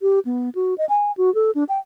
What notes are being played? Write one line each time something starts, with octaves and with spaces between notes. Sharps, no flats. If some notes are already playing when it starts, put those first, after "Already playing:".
G4
B3
F#4
D#5
G#5
F#4
A4
D4
G5